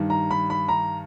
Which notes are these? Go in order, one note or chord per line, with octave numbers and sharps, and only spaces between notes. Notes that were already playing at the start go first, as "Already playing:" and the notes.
Already playing: G2 D#3
A#5
B5
B5
A#5